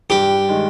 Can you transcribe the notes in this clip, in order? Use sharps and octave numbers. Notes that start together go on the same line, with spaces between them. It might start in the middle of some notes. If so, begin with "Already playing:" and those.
G2 G4
D#3 G#3